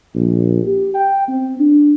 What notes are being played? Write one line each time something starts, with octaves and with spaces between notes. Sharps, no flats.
A#1
G4
G5
C4
D4